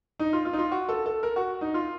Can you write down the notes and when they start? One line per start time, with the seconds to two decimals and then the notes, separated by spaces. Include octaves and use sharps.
0.20 D#4
0.33 F4
0.45 F4
0.53 D#4
0.58 F4
0.71 F#4
0.89 A4
1.06 A4
1.23 A#4
1.36 F#4
1.61 D#4
1.74 F4